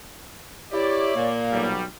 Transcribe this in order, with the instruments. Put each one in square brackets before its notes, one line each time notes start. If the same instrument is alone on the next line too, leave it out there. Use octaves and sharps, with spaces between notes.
[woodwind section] E4 G4 [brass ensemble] C#5 D5
[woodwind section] A#2 A#3
[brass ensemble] B1 F#3 G3